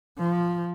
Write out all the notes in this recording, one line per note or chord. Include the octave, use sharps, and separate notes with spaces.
F3